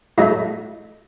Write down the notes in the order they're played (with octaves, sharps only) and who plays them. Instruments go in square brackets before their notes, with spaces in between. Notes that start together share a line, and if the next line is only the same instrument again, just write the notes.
[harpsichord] A2 F#3 A3 D#4